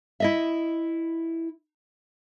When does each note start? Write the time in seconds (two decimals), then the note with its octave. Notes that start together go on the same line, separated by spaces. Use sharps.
0.20 E4 D#5 E5